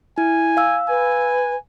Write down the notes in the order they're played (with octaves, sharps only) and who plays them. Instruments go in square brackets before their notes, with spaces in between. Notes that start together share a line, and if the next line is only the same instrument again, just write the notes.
[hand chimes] E4 [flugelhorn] G#5
[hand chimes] F5 E6
[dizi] B4 [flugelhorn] G#5